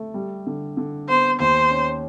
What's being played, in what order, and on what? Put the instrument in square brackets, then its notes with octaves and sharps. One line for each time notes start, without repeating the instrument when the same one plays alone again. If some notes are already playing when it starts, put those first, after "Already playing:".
Already playing: [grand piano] A3
G3
D3
D3
[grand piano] B3 [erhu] C5
[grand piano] D#2 [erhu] C5
[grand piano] C#4